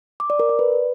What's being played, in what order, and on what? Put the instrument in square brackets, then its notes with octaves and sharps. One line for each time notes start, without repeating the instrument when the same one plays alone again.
[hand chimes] D6
D5
A#4
D5
B4